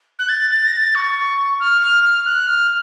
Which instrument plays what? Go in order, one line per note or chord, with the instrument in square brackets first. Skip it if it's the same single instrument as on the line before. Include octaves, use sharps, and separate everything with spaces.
[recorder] F#6
A6
A6
A#6
A6
C#6
F6
F6
F6
F#6
F6